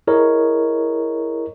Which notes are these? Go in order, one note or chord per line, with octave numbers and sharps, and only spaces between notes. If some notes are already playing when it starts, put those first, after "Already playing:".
E4 G#4 A#4 C#5 D#5